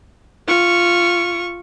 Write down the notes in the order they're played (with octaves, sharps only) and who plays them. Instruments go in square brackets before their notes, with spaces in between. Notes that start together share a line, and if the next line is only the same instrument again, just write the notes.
[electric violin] F4 C#6